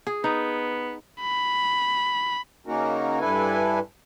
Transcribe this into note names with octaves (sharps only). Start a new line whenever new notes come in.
G#4
B3 D#4
B5
C#3 A#3 C#4 D#4 F#4 A#4
G2 D4 E4 A4 B4 G#5